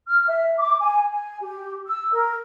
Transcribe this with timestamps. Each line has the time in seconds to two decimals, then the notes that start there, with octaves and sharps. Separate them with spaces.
0.07 F6
0.28 E5
0.58 D6
0.79 G#5
1.08 G#5
1.40 G4
1.86 E6
2.12 A#4